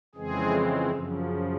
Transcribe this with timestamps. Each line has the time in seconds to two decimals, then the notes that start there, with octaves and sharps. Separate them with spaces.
0.15 F2 C#3 E3 G#3 C4 G#4
0.91 F#2 C#3 F3